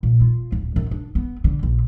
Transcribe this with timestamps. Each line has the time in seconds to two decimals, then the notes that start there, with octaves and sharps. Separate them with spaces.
0.03 A#2
0.21 F4
0.52 D1
0.76 F#2
0.91 D4
1.15 B3
1.44 D3
1.63 A#1